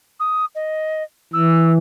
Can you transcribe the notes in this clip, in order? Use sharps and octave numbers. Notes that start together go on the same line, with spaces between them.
D#6
D#5
E3 E6